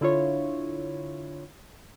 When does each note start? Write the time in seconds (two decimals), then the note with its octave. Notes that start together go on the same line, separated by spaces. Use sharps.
0.01 D3 E4 F4 C#5